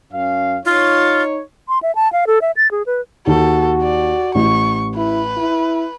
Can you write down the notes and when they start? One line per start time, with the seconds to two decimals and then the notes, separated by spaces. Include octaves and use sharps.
0.13 F#2 C#4 F5
0.65 D#4 F4 C#5
1.68 C6
1.83 E5
1.95 A5
2.13 F5
2.27 A4
2.42 E5
2.57 A6
2.71 G#4
2.86 B4
3.27 D#2 F#4 A4
3.82 D5
4.35 A1 C#6
4.97 E4 B4
5.37 E4